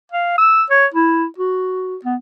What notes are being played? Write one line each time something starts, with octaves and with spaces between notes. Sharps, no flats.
F5
E6
C#5
E4
F#4
B3